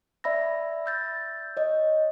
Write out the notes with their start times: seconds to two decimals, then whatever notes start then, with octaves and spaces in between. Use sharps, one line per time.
0.24 D5 E5 B5 E6 A#6
0.86 E6 G6 A6
1.57 C#5 D#5